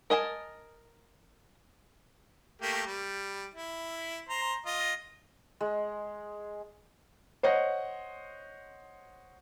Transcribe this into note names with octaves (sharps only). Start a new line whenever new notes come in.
A#4 D#5 G#5 A5
A3 A#3 G4
G3
E4
C5 A#5
F4 D#5
G#3
C5 C#5 D#5 F#5